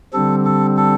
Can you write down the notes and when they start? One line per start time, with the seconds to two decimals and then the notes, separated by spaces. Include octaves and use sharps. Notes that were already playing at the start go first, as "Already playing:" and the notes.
0.13 D3 G3 C4 A4
0.45 A4
0.77 A4